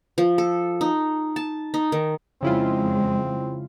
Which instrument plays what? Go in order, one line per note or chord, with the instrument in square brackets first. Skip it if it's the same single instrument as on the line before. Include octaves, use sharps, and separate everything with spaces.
[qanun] F3
A4
D#4
A5
D#4
D#3
[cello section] F2 G#3 [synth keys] C#3 E4 F4 [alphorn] C4